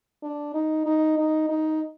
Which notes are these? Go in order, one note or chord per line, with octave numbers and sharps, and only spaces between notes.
D4
D#4
D#4
D#4
D#4